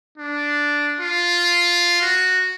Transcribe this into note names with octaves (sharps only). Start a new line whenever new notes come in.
D4
F4
F#4